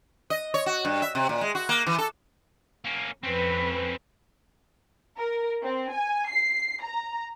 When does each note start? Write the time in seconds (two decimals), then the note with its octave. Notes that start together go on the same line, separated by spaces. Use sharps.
0.30 D#5
0.54 C#5
0.66 F#4
0.85 G2
1.02 E5
1.15 C3
1.29 A#2
1.41 G#3
1.55 F#4
1.69 A#3
1.87 E3
1.98 A4
2.85 A#3 C#4
3.23 F2 C4 C#4 B4
5.17 A#4
5.62 C4
5.92 G#5
6.29 C7
6.82 A#5